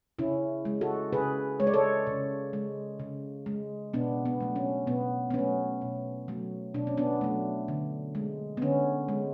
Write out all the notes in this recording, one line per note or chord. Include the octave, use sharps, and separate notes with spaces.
C#3 C#4 E4
G#3
F#4 A4
C#3 G#4 B4
G#3 C#5
D5
A4 C#5
C#3
G#3
C#3
G#3
B2 B3 D4
B3
F#3 A3
C#4
B2 B3
B3
F#3 A3 C#4
B2
F#3 A3
B2 D4
C#4
B3 D4
F#3 A3
D3
G#3
B3
D3 C#4
G#3